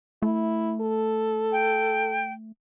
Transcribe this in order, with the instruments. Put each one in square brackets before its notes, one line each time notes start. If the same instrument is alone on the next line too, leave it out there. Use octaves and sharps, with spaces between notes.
[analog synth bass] A3 [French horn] E4
[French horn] A4
[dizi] G5